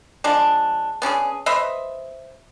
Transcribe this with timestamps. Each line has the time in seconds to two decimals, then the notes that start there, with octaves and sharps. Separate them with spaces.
0.24 F3 G#3 D4
1.02 B3 C#4 D4 G#4
1.46 B4 C5 D#5 E5